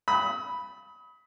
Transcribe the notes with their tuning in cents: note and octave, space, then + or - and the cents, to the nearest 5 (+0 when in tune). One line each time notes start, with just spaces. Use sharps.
B5 +0 D#6 +35